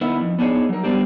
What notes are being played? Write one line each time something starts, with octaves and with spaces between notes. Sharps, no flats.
D#3 B3 E4
F2
B3 D4 D#4 G#4 C#5
F#3 A#4
F#3 G3 B3 C4 D4 G4